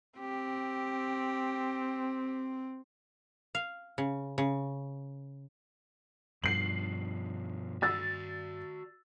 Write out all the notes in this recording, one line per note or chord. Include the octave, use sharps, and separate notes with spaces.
C4 G4
F5
C#3
C#3
G2 B2 F3 C7 F#7
F#4 D5 E6 A6